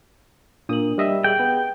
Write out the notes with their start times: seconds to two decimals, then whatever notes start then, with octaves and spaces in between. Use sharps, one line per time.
0.69 A#2 D4 A#4 D#6 F#7
0.98 G3 D#5 E5
1.24 G#4 G5 F#7
1.40 B3